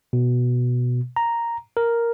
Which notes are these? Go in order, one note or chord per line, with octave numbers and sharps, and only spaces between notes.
B2
A#5
A#4